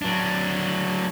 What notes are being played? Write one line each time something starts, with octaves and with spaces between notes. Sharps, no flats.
F#3 D4